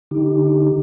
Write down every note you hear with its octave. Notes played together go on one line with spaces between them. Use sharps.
D3 D#4 G4